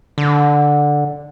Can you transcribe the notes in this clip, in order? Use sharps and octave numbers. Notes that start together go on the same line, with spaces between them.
D3